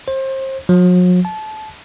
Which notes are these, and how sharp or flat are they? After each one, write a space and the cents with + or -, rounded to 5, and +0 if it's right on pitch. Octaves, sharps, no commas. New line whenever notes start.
C5 +30
F#3 -45
A5 -25